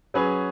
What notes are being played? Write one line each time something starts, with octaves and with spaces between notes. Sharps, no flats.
F#3 C#4 G#4 B4